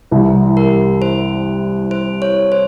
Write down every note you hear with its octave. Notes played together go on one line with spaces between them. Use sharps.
C2 C3 E3 G3
A#4
C5
C5
C#5
C5